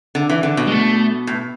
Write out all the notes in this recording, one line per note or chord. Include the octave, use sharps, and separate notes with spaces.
D3
E3
D3
B2
G#3
A3
A2